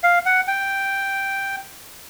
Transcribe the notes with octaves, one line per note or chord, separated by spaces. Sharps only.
F5
F#5
G5